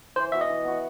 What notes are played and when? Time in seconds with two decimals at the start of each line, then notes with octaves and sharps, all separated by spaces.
0.16 E3 C5
0.32 B3 F#4 E5
0.41 D#5
0.50 E3
0.65 B3 F#4